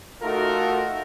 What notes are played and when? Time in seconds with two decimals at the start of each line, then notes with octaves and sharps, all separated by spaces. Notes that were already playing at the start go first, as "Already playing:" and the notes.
0.23 A3 D#4 F4 F#4 A4 A#4